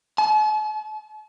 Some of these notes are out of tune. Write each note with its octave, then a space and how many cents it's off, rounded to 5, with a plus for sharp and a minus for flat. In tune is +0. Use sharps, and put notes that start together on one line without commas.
A5 -45